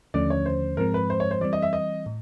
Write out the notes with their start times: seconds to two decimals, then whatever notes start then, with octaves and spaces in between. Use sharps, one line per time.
0.14 D#2 D3 F3 A3 C#4 D5
0.30 C#5
0.46 C5
0.77 G#2 F3 G#3 C4 A#4
0.94 B4
1.10 C5
1.20 C#5
1.31 C5
1.41 E3 G3 C4 D5
1.53 D#5
1.62 E5
1.73 D#5
2.06 A2